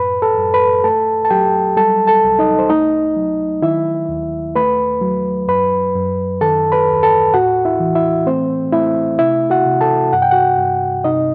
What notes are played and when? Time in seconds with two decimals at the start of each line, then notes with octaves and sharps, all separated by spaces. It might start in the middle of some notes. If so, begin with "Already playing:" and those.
Already playing: F#2 A2 B4 B5
0.22 A4 A5
0.37 F#2
0.54 B4 B5
0.84 A3 A4 A5
1.25 A5
1.30 F#3 G4 G5
1.77 G3 A4 A5
2.07 A4 A5
2.24 C2
2.39 D#4 D#5
2.59 C5
2.69 A3 D#4 D#5
3.16 F#3
3.62 D#3 E4 E5
4.09 D#2
4.55 A3 B4 B5
5.01 F#3
5.48 F#2 B4 B5
5.95 F#2
6.41 D#3 A4 A5
6.72 B4 B5
6.88 D#2
7.03 A4 A5
7.34 A2 F#4 F#5
7.65 E4 E5
7.80 E3
7.95 E4 E5
8.26 A3 C4 C5
8.72 A3 E4 E5
9.19 C3 E4 E5
9.50 F#4 F#5
9.66 C3
9.81 A4 A5
10.13 G2 F#5
10.22 G5
10.31 F#4 F#5
10.58 G2
11.04 C3 D#4 D#5